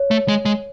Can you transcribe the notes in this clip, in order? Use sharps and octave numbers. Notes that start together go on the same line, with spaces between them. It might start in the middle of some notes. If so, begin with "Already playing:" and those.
Already playing: C#5
A3
G#3
G#3